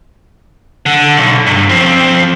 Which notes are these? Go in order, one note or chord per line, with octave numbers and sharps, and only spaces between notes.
D3
B1
G2
F3 C4